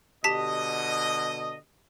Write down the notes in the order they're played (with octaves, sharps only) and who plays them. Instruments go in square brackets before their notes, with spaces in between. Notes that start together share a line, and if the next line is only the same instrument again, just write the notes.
[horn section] B2 D3 D#5 [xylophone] G4 A5 B6